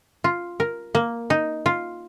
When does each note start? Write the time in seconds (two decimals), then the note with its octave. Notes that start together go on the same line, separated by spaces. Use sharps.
0.24 F4
0.60 A#4
0.95 A#3
1.30 D#4
1.66 F4